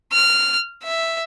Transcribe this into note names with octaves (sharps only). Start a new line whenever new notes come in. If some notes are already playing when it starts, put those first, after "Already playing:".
F6
E5